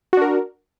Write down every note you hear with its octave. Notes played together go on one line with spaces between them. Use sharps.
D4 F#4 A#4